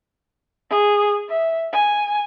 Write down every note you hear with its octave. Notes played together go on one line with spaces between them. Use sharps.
G#4
E5
G#5